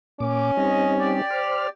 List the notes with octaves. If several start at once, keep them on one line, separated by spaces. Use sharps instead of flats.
A#2 C#4 D6
G3 C4 D#4 D#5
G4 D5
C5 F6